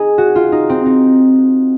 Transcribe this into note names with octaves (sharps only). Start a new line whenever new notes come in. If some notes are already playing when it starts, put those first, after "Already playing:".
Already playing: D#4 G#4
F#4
F4
D#4
C4
D#4